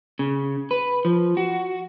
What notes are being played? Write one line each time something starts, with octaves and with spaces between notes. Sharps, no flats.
C#3
B4
F3
F#4